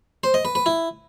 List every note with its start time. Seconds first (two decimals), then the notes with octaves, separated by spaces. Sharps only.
0.24 C5
0.34 D#5
0.45 B4
0.55 B4
0.66 E4